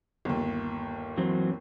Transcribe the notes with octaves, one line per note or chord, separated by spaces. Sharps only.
G1 D#2
E3 F#3 C4